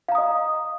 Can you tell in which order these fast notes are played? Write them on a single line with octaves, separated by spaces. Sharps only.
F5 A#5 D#6 D#5